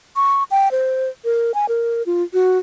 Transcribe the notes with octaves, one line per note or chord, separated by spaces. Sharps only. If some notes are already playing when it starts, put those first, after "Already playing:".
C#6
G5
C5
A#4
G#5
A#4
F4
F#4